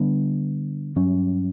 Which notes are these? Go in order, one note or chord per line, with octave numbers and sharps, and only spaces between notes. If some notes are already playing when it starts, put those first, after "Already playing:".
Already playing: D3 G3 B3 D4
G2 F#3 C#4